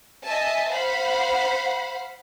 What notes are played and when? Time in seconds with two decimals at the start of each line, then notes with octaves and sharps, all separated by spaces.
0.25 D#5 E5 G#5 A5
0.70 C5 F5 F#5 B5